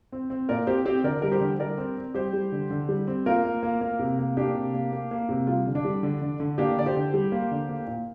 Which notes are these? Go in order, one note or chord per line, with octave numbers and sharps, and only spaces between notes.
C4
C4
A#2 A#4 D5
C4 G4 C5
C4 G4 C5
D3 A#4 D5
G3 A#4
G4 C5
D3
G3 A#4 D5
C4
C4
G3 G4 C5
G3
D3
D3
G3
C4
A#3 F4 A#4
A#3
A#3
A#3
C3
A#3
A#3 D4 G4
C3
A#3
A#3
A#3
C3
G3 F4
D3
D4
G3
D3
D3
D3
A#3 D4 G4
D3 D5
G4 C5
D3
G3
A#3
D3
A#3
A#2